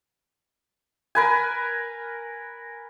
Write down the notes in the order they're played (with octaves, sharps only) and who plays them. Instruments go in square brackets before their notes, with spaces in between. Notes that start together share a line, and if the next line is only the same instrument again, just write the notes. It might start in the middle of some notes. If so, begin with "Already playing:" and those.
[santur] A#4 B4 G#5